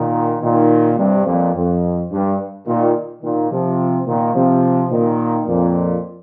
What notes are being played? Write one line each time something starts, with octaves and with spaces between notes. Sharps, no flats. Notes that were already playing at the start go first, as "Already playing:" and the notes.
Already playing: A#2 D#3
A#2 D#3
G2 C3
F2 A#2
F2
G2
A#2 D#3
A#2 D#3
C3 F3
A#2 D#3
C3 F3
A#2 D#3
F2 A#2